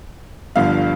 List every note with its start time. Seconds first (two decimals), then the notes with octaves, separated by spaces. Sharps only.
0.56 G1 G2 D3 F3 F5